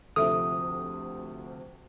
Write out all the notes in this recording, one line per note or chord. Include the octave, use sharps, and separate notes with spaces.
D2 C3 F3 A4 E5 D#6